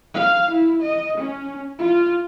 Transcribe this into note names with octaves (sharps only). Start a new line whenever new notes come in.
F5
E4
D#5
C#4
F4